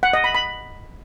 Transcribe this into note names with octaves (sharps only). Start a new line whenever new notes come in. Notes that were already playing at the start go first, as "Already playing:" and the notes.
F#5
D#5
B5
B5